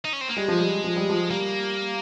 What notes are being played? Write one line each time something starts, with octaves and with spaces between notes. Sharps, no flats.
D#4
C#4
C4
A#3
G3 G#3
F3
G3
F3
G3
F3
G3 A#3